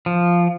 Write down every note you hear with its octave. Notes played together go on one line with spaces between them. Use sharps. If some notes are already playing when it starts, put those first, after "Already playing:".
F3